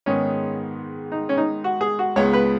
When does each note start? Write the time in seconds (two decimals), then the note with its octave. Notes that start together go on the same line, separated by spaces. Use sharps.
0.06 G#2 D#3 B3 C#4 D#4
1.12 D#4
1.29 C#4
1.37 D#4
1.64 F#4
1.81 G#4
1.99 F#4
2.16 C#2 C#3 G#3 B3 C#5
2.33 B4